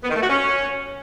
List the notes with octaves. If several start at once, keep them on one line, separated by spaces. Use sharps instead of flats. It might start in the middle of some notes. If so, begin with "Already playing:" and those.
B3
D#3
A3
F#4
C#4